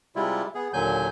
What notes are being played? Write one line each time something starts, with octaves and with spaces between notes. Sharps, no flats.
C3 G3 G#3 E4 F4
B3 G#4
D#2 A#2 D3 F#3 G#5 G6